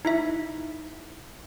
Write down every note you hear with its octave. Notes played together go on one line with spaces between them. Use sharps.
D#4 E4 E5